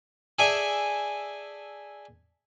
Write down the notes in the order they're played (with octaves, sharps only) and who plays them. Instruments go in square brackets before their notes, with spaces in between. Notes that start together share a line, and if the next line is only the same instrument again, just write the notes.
[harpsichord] G#4 A4 D5 E5 G#5